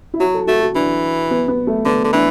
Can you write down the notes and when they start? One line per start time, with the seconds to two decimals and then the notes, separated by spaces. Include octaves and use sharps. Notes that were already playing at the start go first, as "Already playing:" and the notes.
0.14 E4
0.20 F#3 F#4
0.34 A4
0.47 A3 F#4
0.61 F#4
0.75 E3 D4
1.31 B3
1.48 B3
1.67 A3
1.85 D3 B3
2.04 D3
2.13 E3 D4